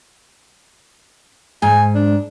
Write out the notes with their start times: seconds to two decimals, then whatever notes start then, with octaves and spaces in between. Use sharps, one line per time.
1.62 G#2 G#5
1.95 D4